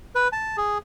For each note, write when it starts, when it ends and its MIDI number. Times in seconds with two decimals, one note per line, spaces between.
0.15 0.28 71
0.32 0.57 81
0.57 0.78 68